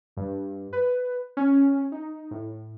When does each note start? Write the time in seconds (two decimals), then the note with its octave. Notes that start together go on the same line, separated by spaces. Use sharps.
0.17 G2
0.73 B4
1.37 C#4
1.92 D#4
2.31 A2